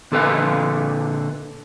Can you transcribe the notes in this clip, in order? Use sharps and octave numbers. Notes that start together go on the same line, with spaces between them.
A#2 D3 A4 B4 F5 G#5